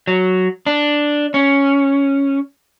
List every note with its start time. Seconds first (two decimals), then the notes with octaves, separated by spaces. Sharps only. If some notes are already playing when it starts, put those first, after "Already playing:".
0.07 F#3
0.66 D4
1.34 C#4